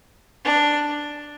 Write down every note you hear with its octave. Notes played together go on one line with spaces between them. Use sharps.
D4